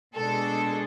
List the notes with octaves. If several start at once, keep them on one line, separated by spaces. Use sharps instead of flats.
B2 G#3 D4 A4